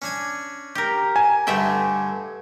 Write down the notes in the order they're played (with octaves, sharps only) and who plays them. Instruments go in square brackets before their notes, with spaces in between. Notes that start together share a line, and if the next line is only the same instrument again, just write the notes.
[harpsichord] C#4 D4 G#5
[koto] G4 A#4
[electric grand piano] G#5
[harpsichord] G2 D3 [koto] A3 E5 G5